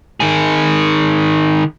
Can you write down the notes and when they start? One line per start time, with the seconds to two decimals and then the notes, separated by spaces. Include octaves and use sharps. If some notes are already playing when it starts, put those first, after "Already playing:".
0.20 D#3 G#4